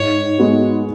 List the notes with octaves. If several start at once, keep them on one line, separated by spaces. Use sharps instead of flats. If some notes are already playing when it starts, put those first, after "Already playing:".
Already playing: G#2 C#5
G#3 B3 F#4